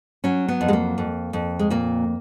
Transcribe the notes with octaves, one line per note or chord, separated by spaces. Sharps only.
F#3 C#4
B3
F2
G#3
A#3
F2
F2
G#3
A#2 A#3